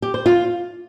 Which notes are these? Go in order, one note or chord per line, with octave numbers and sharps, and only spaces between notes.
G4
C5
F4